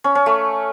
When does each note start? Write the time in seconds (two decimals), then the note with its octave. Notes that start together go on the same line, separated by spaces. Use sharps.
0.04 C#4
0.15 C#4
0.26 A3